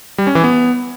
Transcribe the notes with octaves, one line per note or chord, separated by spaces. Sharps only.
G3
C#4
E3
B3